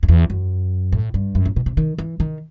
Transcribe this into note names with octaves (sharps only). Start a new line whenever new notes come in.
F#2
E2
F#2
A2
G2
F#2
A2
B2
C3
D#3
E3
D#3